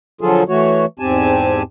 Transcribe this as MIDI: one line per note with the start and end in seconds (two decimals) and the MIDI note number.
0.21 0.43 50
0.21 0.43 53
0.21 0.43 54
0.21 0.43 65
0.21 0.43 68
0.21 0.43 69
0.48 0.86 52
0.48 0.86 57
0.48 0.86 66
0.48 0.86 73
0.99 1.62 40
0.99 1.62 44
0.99 1.62 60
0.99 1.62 67
0.99 1.62 80
0.99 1.62 81